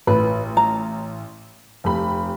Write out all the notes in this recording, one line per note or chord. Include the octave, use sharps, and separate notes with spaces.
A1 B4
A#5
F1 G4 B5